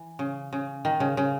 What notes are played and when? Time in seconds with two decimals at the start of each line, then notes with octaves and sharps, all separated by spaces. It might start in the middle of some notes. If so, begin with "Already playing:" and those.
Already playing: E3
0.19 C#3
0.53 C#3
0.85 D#3
1.00 C#3
1.17 C#3